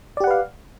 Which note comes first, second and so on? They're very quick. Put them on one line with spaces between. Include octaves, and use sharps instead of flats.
D5 G4 F#5 B4 F5